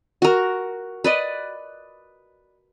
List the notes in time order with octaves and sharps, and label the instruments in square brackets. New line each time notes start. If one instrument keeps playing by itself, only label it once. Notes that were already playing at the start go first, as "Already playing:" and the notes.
[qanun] F#4 A#4
B4 D5 D#5